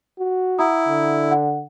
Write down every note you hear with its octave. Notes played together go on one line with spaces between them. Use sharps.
F#4
E4 F#5 A#5 D#6
D3
F#5